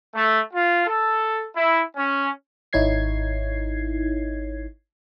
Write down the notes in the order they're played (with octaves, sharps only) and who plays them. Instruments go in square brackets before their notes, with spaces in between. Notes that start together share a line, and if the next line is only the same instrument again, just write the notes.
[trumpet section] A3
F4
A4
E4
C#4
[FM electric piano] G#1 D#4 E4 C#5 G#6 C7